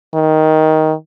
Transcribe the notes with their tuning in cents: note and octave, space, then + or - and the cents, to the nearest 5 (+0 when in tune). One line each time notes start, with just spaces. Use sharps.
D#3 +10